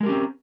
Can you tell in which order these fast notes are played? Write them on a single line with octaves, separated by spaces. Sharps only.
G#3 A#4 G4 C#4 C4